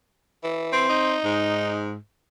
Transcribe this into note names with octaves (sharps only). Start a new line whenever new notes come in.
E3
C4
D#4
G#2